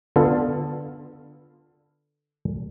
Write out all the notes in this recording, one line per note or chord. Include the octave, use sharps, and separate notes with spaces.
D3 B3 F4 A4